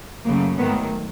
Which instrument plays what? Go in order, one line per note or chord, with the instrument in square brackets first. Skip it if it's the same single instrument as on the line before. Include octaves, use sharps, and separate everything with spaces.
[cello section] F#2 C#3 F#3 A3 A#3
G#2 D#3 F#3 A3 B3